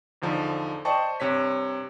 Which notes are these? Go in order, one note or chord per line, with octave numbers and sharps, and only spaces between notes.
E2 D3 F3 D#4
C5 D5 D#5 G5 A5 C#6
G2 C3 C#5 B6